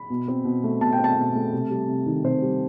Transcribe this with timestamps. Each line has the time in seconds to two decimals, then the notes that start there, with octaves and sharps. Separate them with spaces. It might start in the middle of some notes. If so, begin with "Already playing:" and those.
Already playing: B5
0.10 B2
0.28 C4
0.45 B2
0.64 A3
0.81 B2 A5
0.92 G5
0.99 C4
1.04 A5
1.17 B2
1.35 A3
1.53 C3
1.70 G3
1.88 C3
2.06 D#3
2.24 C3 C5
2.42 G3